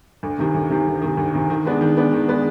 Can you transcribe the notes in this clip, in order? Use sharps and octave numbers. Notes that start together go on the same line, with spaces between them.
D2
C3 D#3
D2
C3 D#3
D2
C3 D#3
D2
C3 D#3
D#3
G#3 B3 D4
D#3
G#3 B3 D4
D#3
G#3 B3 D4